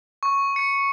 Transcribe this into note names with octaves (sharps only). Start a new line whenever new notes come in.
C#6
C#7